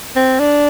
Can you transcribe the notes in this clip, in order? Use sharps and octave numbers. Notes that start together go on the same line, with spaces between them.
C4
D4